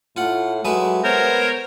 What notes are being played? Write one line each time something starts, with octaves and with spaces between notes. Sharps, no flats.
A2 F4 F#5
F#3 G#3 A3 B4
B3 A#4 C5 C#5